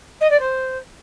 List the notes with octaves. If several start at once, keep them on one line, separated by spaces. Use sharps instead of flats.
D#5
D5
C5